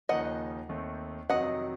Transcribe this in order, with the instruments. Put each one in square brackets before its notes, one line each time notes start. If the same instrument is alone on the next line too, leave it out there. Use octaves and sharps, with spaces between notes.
[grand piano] D#2 C#3 F3 A#3 D#4 [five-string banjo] D#5 F#5
[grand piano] D#2 D#3 A3 C4
[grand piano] F2 C3 D#3 F#3 [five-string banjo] D#5 F#5